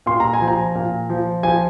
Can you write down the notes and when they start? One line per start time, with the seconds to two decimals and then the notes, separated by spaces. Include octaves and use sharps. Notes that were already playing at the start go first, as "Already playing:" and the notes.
0.06 A#2 C6
0.20 A#5
0.33 G#5
0.41 F3
0.48 A#5
0.75 A#2
1.10 F3
1.43 F3 G#5